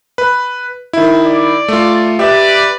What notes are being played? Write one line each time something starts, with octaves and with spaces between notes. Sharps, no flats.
B4
D#3 E4
D5
A3 F4
G4 B4 D5 E5